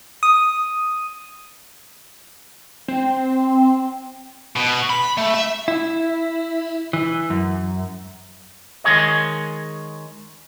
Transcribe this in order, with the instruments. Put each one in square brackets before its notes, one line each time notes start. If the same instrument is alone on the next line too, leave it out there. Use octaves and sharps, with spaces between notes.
[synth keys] D#6
[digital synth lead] C4
[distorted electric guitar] B2
B5
A3
E5
[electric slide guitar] E4
E3
F#2
[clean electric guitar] D#3 G#3 G#4 C#5 D#5